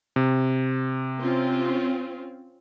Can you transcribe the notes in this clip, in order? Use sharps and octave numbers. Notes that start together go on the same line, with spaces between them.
C3
C4 C#4 F4